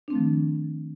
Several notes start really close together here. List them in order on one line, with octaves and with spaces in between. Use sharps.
D4 C4 A3 F3 D#3